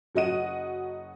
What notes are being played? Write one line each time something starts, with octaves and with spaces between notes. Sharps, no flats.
F#1 F#3 F#4 D#5 F#5 D#7